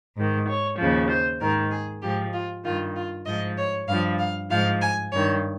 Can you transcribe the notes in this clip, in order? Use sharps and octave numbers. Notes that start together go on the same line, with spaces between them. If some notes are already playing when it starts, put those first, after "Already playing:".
G#2 D#3
C#5
D#2 C#3 F3
C5
G#2 D#3 A#4
G#4
G#2 F3 G4
F4
G2 D#3 F4
F4
G#2 F3 D#5
C#5
G2 F3 F5
F5
G#2 F3 F5
G#5
G2 D#3 C#5